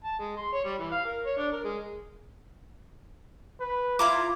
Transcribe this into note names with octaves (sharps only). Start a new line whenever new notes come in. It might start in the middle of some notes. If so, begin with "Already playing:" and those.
A5
G#3
C6
C#5
G3
E3
F5
A#4
C#5
D4
A#4
G#3
B4
E4 F4 A#5 D6